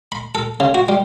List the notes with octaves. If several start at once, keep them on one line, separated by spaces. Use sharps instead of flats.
B5
A4
C#3
F#4
G3